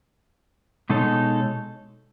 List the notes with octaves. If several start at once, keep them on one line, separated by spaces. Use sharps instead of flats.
B2 G#3 D#4 A4 C#5